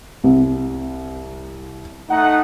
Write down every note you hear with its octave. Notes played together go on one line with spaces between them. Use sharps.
C2
A3 D#4 F#5